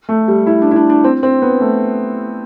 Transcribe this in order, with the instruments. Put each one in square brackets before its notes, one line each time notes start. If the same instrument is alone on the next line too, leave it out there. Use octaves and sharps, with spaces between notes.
[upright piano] A3
G3
E4
D4
E4
D4
D4
C4
C4
B3
A3